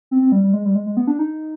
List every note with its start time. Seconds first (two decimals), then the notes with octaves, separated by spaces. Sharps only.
0.11 C4
0.22 C4
0.32 G3
0.44 G3
0.53 G#3
0.65 G3
0.75 G#3
0.86 G#3
0.97 B3
1.07 D4
1.19 D#4